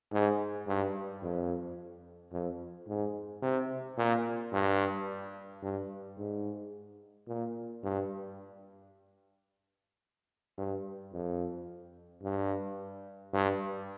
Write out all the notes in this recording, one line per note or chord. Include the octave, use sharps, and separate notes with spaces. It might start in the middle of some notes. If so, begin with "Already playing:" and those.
G#2
G2
F2
F2
G#2
C3
A#2
G2
G2
G#2
A#2
G2
G2
F2
G2
G2